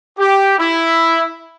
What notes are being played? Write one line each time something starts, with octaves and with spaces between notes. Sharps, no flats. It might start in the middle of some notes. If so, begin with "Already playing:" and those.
G4
E4